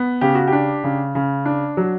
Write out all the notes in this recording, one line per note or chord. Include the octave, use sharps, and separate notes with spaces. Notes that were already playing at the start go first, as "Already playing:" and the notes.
Already playing: B3
C#3 G4
F#4
G4
D4
C#3
C#3
D4
F#3